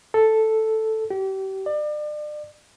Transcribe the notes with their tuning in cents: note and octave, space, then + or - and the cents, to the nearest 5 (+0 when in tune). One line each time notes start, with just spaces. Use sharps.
A4 +0
G4 -35
D5 +35